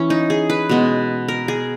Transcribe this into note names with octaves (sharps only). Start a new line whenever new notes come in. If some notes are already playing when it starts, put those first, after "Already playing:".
Already playing: E3 C#4
D#4
G#4
B4
B2 G#3 B3
A#4
G#4